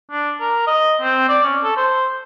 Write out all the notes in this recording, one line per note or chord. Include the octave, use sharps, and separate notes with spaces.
D4
A#4
D#5
C4
D5
C#4
A4
C5